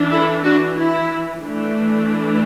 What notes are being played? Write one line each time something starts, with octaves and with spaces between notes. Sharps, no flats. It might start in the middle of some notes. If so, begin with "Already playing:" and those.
Already playing: E3 D4
E4 A4
D4 F#4
E4
E3 A3 D4